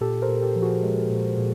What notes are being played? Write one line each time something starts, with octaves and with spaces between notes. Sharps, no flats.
A#2 G4 A4
A#4 C5
A#2
G4 A4
F3
F#4 G#4
G#3
A#2
A#2